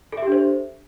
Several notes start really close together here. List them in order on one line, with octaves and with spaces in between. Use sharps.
A4 E5 G4 D4 C5